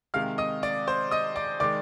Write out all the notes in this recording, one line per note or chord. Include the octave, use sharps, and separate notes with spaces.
C3 D#3 G#3 F5 F6
D#5 D#6
D5 D6
C5 C6
D#5 D#6
D5 D6
D#3 G#3 D5 D6